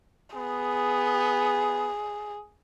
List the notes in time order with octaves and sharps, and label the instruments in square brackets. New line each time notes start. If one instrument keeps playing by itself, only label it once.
[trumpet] B3 [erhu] G#4